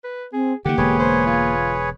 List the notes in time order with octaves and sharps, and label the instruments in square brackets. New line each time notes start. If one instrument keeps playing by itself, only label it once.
[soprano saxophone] B4
[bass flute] C4 [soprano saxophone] G#4
[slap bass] D3 D#3 [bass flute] A#3 [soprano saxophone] G4 [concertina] F#5
[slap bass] E1 D3 G#3 [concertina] G#4 B4 C#5
[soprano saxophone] C5
F4